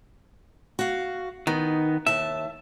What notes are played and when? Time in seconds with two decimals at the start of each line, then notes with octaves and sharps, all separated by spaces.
0.79 F#4 F5
1.47 D#3 B3 D#4
2.06 D#2 E5 A5